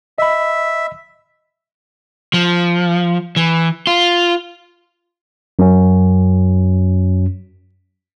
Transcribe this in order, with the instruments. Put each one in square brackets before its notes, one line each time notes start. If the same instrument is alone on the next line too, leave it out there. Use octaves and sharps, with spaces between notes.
[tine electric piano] D#5 B5 [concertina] E5
[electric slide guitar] F3
E3
F4
[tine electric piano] F#2 C#4